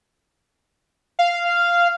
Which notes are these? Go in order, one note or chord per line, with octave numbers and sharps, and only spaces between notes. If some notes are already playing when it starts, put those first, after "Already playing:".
F5